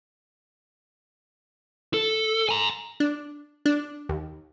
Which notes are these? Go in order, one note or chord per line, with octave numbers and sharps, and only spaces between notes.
A4
G#5 A#5
D4
D4
D#2